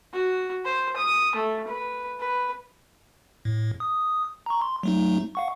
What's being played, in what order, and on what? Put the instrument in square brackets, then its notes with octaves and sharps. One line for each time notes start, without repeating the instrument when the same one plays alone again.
[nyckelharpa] F#4
C5
D#6
A3
B4
B4
[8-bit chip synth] A2
D#6
A#5 C#6
C6
F#3 A3 D#4
F5 F#5 C#6